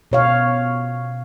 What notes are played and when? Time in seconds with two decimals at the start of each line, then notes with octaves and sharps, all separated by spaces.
0.12 B2 C#5 F5